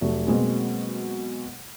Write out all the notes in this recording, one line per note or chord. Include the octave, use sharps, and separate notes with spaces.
F1 F#3 A3
B2 F#3 G#3 A#3 C4 G#4